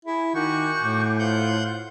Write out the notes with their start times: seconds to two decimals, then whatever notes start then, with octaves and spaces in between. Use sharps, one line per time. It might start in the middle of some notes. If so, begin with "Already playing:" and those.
0.05 E4 G#4
0.35 D#3 F#4 G#5 C#6 D6 G6
0.81 A2
1.19 F4 C5 F5 F#5 G6